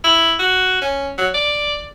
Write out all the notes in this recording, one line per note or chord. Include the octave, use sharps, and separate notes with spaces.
E4
F#4
C#4
F#3
D5